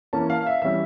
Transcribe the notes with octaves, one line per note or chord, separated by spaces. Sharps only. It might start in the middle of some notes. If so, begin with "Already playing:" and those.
E3 A#3 C#4 A5
F5
E5
E3 G3 C#4 E5